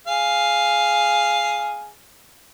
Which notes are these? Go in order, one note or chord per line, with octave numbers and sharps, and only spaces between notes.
G#4 F5